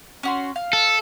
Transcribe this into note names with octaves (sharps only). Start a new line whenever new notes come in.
C#4 F#4 C6
F5
A4